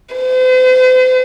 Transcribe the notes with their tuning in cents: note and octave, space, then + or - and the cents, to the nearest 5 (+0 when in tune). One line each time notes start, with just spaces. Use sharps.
C5 -40